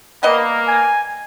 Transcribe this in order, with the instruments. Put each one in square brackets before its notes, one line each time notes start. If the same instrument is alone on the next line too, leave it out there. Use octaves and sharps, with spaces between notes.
[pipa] G3 B3 D#5 [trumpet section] A#3
[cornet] G#5